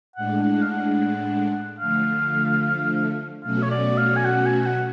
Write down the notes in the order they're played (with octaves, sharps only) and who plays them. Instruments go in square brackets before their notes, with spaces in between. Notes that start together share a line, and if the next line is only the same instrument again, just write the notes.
[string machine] A2 G#3 D4 [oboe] F#5
[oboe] F#5
F5
F#5
[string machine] D3 F3 A3 [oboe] F5
[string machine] B2 F#3 A3 C#4 F#4 [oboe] F5
[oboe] C#5
D5
F5
G#5
F#5
G#5
F#5